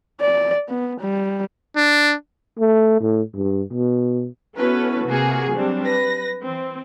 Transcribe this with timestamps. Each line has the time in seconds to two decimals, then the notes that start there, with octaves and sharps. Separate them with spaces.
0.21 D5
0.69 B3
1.00 G3
1.76 D4
2.59 A3
3.01 A2
3.35 G2
3.73 B2
4.57 B3 C#4 E4 F#4 A4 B4
5.07 C3 A#3 F#4 G#4
5.52 F#3 G3 C4 D4
5.83 B4 A#6
6.44 E3 C4